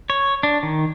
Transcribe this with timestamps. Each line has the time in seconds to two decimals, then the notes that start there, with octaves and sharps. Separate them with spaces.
0.10 C#5
0.43 D4
0.63 D#3